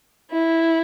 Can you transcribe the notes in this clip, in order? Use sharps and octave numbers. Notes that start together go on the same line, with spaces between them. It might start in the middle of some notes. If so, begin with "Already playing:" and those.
E4